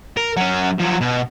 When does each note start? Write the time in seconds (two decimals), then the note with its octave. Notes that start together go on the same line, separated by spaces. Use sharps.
0.17 A#4
0.37 F#3 C#4
0.79 F3 F#3
1.01 B2